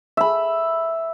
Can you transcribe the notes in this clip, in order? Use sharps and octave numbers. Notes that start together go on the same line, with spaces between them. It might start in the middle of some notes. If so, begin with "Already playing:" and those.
E5 B5